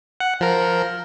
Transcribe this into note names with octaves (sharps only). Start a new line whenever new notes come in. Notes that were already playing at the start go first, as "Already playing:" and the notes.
F#5
F3 A#4